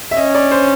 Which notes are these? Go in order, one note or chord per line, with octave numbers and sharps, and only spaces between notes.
E5
C#4 D#5
D5
C5